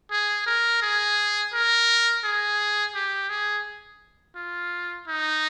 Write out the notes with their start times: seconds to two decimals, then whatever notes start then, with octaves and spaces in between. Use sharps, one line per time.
0.11 G#4
0.46 A#4
0.82 G#4
1.53 A#4
2.24 G#4
2.95 G4
3.29 G#4
4.36 F4
5.07 D#4